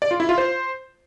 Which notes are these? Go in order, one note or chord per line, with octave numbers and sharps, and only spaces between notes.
D5
F4
E4
F4
C5